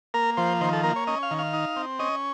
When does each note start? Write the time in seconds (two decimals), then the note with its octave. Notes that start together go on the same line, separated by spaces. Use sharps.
0.14 A#3 A#4
0.37 F3 C5
0.61 D#3 C5
0.73 A4
0.83 A#3 A#4
0.96 C#5
1.07 C#4 D#5
1.23 F5
1.31 D#3
1.39 F5
1.53 D#4
1.76 C4
1.99 C#4 D#5